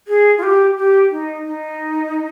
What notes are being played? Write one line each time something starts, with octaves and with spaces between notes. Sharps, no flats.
G#4
F4
G4
G4
D#4
D#4